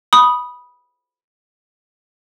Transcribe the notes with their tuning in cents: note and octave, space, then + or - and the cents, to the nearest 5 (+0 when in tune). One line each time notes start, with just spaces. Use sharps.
B5 -10 D#6 +0